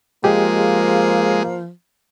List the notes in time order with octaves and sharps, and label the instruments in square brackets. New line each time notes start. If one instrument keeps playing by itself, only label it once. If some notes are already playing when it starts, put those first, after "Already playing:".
[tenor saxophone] F3 [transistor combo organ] G#3 [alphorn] A#3 [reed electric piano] G4 G#4 D#5